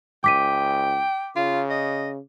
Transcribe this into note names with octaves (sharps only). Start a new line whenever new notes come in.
C#2 G5 D6 B6 D#7
C#3 F4
D#5